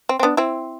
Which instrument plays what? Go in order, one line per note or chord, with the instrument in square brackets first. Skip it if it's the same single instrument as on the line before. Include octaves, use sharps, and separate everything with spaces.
[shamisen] C4
C4
B3 D4
C4 E4